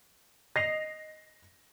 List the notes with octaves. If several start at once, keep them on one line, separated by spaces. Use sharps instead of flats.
D#5 A#6 C7 F7